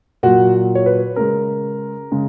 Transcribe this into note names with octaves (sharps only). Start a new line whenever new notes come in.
A#2 F#3 F#4
C#5
B4
C#3 G#3 A#4
C#3 G#3